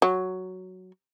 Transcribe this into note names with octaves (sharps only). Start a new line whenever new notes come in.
F#3